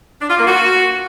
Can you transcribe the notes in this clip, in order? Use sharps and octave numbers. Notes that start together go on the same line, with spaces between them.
D4
F4
A#3
F#4